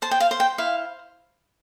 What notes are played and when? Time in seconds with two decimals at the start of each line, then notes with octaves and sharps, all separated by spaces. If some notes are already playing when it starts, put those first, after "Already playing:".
0.02 C5 A5
0.11 G5
0.20 F5
0.31 C5
0.40 G5
0.58 E4 F5